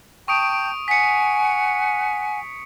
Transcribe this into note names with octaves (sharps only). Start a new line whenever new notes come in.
G5 A5 C#6 D#6 G6 D7
F#5 G#5 B6 C#7